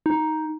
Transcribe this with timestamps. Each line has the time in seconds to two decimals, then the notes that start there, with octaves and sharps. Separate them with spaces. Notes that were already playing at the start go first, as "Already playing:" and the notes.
0.06 D#4